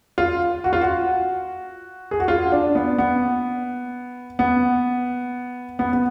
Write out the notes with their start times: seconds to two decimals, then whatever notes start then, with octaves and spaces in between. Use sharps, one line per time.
0.18 F4
0.64 F#4
0.73 F4
0.81 F#4
2.11 G#4
2.20 F#4
2.28 F4
2.52 D4
2.75 B3
2.98 B3
4.39 B3
5.79 B3
5.93 B3